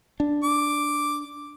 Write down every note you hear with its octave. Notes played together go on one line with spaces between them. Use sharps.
D4
D6